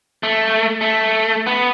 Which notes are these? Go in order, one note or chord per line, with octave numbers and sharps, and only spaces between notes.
A3
A3
B3